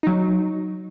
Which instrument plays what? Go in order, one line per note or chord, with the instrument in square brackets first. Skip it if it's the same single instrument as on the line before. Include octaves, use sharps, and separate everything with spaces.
[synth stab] F#3 D#4